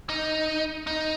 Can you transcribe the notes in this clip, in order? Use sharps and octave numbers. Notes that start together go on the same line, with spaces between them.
D#4
D#4